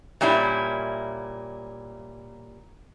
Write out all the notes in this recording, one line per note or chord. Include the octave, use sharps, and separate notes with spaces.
A#2 G3 C#4 E4